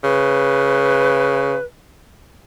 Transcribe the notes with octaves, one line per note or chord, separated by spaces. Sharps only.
C#3 B4